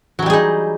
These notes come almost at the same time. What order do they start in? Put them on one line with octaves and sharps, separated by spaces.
F#3 E3 G3 G#4 D#4